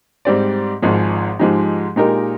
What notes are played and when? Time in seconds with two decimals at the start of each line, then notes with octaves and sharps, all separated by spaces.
0.25 G#2 G3 C4 G4 D5
0.82 G#1 G#2 F3 G#3
1.39 G#2 F3 G#3 D#4 G4
1.96 A#2 G#3 D#4 G4 A#4